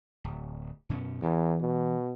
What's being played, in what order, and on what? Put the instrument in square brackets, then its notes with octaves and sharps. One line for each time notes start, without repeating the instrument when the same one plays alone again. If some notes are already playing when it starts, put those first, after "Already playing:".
[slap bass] D1
F#2 B2 C#4
[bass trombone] E2 [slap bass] E3
[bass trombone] B2